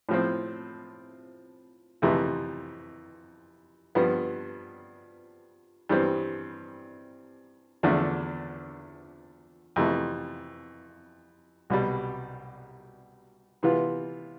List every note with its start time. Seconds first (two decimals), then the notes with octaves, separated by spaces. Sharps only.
0.09 A2 F3 C4
2.02 F2 C3 E3 A3 E4
3.95 G2 F3 B3
5.89 G2 E3 G3 C4
7.83 E2 D3 F3 A3 D4
9.76 F2 C3 E3 A3
11.70 C2 B2 G3
13.63 C3 E3 B3 F4